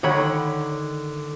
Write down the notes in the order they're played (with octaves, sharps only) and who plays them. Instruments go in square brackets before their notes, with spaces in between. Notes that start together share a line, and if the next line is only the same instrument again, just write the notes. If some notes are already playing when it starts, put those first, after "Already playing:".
[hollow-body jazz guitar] D3 D#3 C#5 B5